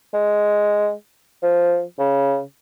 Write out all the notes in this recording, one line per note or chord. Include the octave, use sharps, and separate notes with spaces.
G#3
F3
C#3